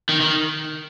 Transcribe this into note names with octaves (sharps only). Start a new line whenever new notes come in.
D#3
D#3